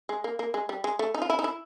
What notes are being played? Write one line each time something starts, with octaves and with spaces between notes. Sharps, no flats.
G#3
A#3
A#3
G#3
G3
G#3
A3
D#4
F4
E4
D#4
E4